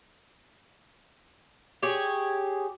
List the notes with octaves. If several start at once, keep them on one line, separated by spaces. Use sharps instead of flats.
G4 G#4 C#5